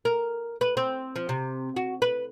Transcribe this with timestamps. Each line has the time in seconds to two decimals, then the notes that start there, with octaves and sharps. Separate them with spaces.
0.05 A#4
0.61 B4
0.77 C4
1.16 F3
1.29 C3
1.76 F#4
2.02 B4